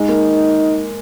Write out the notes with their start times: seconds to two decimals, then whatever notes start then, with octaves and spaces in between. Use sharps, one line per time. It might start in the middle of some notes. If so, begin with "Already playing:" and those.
Already playing: G#3 D#4
0.09 A#3